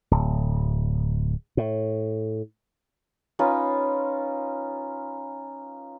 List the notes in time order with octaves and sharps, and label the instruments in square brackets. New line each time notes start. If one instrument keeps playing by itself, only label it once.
[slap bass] D1
A2
[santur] C#4 D#4 F4 B4